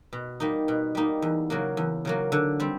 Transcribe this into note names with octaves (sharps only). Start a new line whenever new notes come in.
B2
G3 A#3 D#4
B2
G3 A#3 D#4
E2
C#3 F#3 A#3
E2
C#3 F#3 A#3
D3
G3 C4